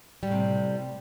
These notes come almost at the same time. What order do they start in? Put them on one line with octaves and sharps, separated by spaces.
G3 A2 C3